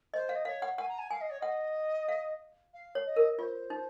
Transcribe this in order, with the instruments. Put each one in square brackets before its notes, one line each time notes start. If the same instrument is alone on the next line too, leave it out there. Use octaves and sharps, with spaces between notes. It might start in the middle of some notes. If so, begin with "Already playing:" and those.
[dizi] C5 [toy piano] D#5
[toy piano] F5
[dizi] D#5
[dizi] C#5 [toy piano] F5
[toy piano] F#5
[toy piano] F#5 [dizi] G#5
[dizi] A#5
G#5
[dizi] F5 [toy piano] G#5
[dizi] D#5
C#5
[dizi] D#5 [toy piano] F#5
[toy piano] F5
[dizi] F5
[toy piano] C#5
[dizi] D#5
[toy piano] A#4
[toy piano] F4 [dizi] C5 C#5
[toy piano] D#4